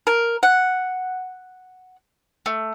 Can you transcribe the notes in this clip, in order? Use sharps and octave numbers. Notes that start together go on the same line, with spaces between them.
A#4
F#5
A3